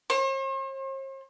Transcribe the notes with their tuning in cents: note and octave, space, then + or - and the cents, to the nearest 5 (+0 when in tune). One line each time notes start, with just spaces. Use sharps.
C5 +45